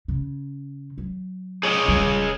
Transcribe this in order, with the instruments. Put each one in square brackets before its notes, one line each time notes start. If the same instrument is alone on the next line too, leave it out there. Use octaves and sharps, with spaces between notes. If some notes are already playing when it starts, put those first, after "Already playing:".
[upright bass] C#3
F#3
[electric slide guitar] G#4 C#5 D#5
[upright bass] D#1 G3